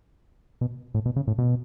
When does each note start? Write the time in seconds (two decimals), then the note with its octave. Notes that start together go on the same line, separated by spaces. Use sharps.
0.61 B2
0.95 A2
1.06 B2
1.16 C#3
1.27 A2
1.38 B2